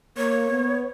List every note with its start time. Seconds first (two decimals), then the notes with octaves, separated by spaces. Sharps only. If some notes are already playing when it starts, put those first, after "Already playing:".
0.17 A#3 C#5
0.50 B3